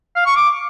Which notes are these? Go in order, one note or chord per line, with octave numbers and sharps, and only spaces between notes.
F5
C#6
D6